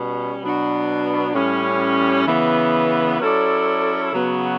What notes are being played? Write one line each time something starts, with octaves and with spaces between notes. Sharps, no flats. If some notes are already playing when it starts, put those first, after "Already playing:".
Already playing: B2 G3 C#4
B2 F#3 B3 D4 F#4
A2 G3 C#4
C#3 E3 B3
F#3 C#4 E4 A4 D5
C#3 F#3 B3 F#4